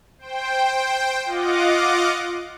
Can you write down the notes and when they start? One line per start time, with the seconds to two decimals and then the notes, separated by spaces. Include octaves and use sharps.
0.19 C5 G5
1.26 F4 D#5 F#5 D6